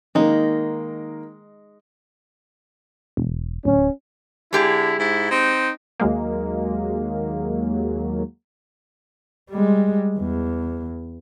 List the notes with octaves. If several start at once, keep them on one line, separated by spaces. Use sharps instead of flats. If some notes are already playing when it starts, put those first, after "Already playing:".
D#3 G#3 A#3 D#4
E1
D1 C#4
D3 G#3 E4 G4 G#4
G#2 E4
C4 D#4
D#2 F#3 G#3 A#3
G3 G#3
E2